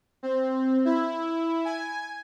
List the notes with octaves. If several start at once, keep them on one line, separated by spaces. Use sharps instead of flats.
C4
E4
G#5